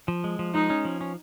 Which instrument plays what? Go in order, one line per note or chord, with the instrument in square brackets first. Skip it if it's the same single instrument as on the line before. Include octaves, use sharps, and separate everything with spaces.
[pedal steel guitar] F3
G#3
F3
[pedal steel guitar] G#3 [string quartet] D#4
[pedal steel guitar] C#4
F3
C#4